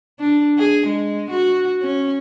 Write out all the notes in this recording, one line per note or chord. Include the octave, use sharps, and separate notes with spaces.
D4
G#4
G#3
F#4
C#4